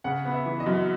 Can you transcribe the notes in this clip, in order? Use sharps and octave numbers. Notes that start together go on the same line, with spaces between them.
C#3 F#5
B3
E5
E3
D#5
F#2